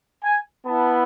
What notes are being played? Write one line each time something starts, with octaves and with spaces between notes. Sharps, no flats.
G#5
B3 E4 A5